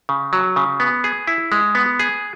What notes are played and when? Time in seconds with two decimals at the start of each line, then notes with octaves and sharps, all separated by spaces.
0.09 C#3
0.33 F#3
0.56 C#3
0.80 B3
1.04 G#4
1.27 E4
1.52 G#3
1.75 B3
1.99 G#4